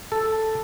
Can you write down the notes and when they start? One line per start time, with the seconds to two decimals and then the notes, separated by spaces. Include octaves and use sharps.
0.12 A4